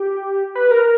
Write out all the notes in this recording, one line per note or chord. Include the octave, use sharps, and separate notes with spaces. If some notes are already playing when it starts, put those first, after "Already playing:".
Already playing: G4
B4
A#4